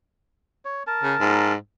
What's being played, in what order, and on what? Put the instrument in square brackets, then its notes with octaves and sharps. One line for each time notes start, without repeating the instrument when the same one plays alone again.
[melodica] C#5
A#4 A5
[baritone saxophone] C#3
G#2